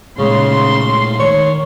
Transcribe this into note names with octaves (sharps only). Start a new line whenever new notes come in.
A#2 C#3 G#3 A3 C6
D#3 C#5